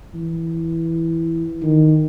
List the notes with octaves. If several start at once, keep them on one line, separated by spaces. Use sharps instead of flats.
E3
D#3